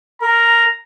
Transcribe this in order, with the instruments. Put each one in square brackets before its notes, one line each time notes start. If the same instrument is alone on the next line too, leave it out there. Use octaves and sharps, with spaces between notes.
[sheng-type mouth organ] A#4 [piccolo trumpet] A#5